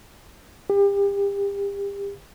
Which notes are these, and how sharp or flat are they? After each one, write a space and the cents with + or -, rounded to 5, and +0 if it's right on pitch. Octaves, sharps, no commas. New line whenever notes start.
G4 +35